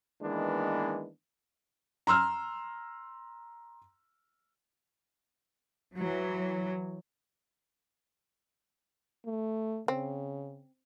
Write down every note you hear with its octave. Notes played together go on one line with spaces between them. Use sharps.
D#3 E3 G#3 A#3 B3 D4
A#5 C6 E6 F6
E3 F#3
A3
C#3 C4